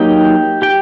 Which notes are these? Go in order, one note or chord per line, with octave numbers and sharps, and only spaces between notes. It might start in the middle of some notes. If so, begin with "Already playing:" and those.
Already playing: F#3 A#3 D#4 G4 G5
G4 G5